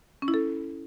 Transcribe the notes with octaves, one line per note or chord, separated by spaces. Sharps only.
C#4
E4
A4